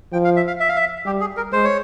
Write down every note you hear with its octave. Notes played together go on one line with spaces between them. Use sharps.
F3 G5
F5
E5
F5
E5
F5
E5
G3 G4
G#4
A#4
G#3 C5
C#5